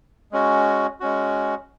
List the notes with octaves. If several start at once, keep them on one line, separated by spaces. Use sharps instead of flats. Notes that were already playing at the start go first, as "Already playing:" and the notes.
G#3 C#4 F#4
G#3 C#4 F#4